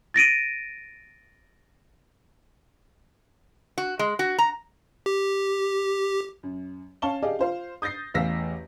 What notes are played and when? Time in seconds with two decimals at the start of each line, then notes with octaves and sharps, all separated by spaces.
0.14 A6 A#6 D7 D#7
3.78 F#4
3.99 G#3
4.19 F#4
4.38 A#5
5.06 G4
6.43 F#2
7.02 C#4 F5 A5 C#6 G7
7.22 G4 G#4 D5 D#5 F5
7.39 F4 C5 F5
7.82 D#6 G6 A6 A#6 C7
8.14 A1 E2 F5 E6 A#6 B6